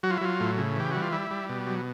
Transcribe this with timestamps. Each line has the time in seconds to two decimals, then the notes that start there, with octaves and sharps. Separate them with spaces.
0.03 F#3 F#4
0.10 F4
0.17 E4
0.21 F#3 F4
0.40 A2
0.58 C#3
0.76 E3 G4
0.91 G3 F#4
1.02 F4
1.13 G3 E4
1.31 G3
1.49 B2
1.67 F#3